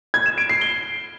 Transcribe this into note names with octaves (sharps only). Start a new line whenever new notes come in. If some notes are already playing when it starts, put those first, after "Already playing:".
G#6
E7
D7
C7
G7